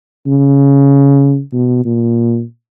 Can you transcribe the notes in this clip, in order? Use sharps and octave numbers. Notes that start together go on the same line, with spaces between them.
C#3
B2
A#2